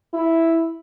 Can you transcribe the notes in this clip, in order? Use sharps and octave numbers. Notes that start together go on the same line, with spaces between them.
E4